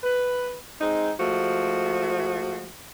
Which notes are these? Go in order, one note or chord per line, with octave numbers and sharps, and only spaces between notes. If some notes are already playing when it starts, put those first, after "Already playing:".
B4
G#3 C4 D#4
F3 G#3 A3 F#4